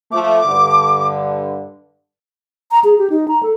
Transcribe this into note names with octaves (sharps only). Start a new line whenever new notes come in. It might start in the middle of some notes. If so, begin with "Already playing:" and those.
F3 A3 D6
G2 D3
A#5
G#4
G4
D#4
A#5
A4